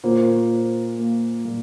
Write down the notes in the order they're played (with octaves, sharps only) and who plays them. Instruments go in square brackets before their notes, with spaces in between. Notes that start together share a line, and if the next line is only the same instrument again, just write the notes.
[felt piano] A#2 A#3 [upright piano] C5
[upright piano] C5
A#3
A#2